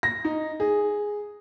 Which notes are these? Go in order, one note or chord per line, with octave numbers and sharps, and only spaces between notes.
A#6
D#4
G#4